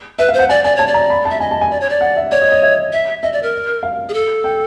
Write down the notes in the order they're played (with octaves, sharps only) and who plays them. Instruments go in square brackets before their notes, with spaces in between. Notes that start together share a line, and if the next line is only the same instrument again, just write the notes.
[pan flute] B4 [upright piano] E5
[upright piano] F5
[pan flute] C5 [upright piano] F#5
[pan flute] D5 [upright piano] G#5
[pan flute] D5 [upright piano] G#5
[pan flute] C#5 [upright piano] A5
[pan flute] D5
[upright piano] A#5
B5
A5
[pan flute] E5
[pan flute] D#5 [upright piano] G#5
[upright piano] A5
G#5
[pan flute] D5
C#5
D5
[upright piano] F#5
E5
[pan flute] C#5 [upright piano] D5
[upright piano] D#5
D#5
E5
[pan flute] E5
[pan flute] D#5 [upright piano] E5
[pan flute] D5
A#4
[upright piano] F5
[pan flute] G#4
A4
[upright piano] G5